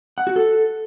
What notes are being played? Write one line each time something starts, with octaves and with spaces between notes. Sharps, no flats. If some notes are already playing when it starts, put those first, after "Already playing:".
F#5
F#4
A4